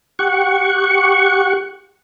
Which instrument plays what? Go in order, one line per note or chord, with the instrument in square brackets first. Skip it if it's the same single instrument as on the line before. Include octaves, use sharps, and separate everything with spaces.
[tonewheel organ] G4 F#5 C#6